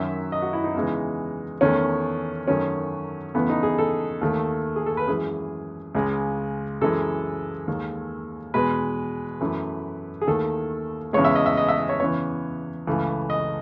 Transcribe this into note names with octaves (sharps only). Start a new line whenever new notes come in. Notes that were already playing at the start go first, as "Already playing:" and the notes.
Already playing: F#2 D#3 F#3 E5
D#5
F#4
E4
D#4
E2 C#3 E3 G#3
E2 D#3 A3 C#4
F#2 D#3 F#3 A3 C#4
E2 C#3 E3 A3 B3
D#4
G#4
A4
D#2 D#3 A3
G#4
A4
B4
F#2 E3 G#3 G#4
C#2 C#3 G#3
F#2 E3 G#3 A4
D#2 D#3 G#3
E2 B2 G#3 B4
F#2 E3 A3
G#4
D#2 D#3 A3 A4
E2 C#3 E3 G#3 C#5
E5
D#5
E5
D#5
E5
D#5
C#5
E2 C#3 E3 C#5
C#2 C#3 E3 A3
D#5